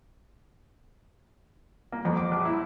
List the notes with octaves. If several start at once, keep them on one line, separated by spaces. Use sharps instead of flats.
A#3
F2
D6
A#1
E4